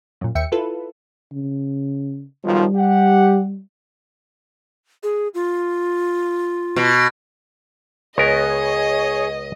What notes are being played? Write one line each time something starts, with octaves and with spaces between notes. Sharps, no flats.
F#2 A#2
D#2 E5 G5 C#7
E4 F4 A4 B4
C#3
B1 D#3 F3 G3
G4 F#5
G#4
F4
B2
C#2 B3 G#4 A#4 C#5 D#5